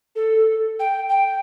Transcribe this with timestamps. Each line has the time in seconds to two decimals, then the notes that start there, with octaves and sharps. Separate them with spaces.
0.16 A4
0.79 G5
1.09 G5